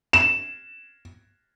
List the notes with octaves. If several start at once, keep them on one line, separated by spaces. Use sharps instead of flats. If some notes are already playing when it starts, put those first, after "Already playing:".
E7